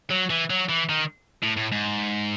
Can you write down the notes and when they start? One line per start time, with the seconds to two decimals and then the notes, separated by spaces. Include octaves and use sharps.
0.11 F#3
0.30 E3
0.50 F#3
0.69 E3
0.89 D#3
1.43 A2
1.57 A2
1.72 G#2